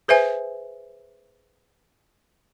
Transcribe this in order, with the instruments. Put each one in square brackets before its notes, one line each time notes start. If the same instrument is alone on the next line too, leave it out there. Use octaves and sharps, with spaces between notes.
[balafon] G#4 B4 C5 E5 G#5